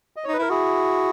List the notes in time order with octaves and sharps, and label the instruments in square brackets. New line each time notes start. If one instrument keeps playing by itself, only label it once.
[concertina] D#5
C#5
[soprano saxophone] D#4
[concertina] B4
[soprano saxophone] E4 [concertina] A#4
[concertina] E4 G#4 [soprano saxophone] F#4